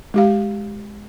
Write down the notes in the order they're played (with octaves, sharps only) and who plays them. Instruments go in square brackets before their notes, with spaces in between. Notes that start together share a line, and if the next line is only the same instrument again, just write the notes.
[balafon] G#3 G4 F5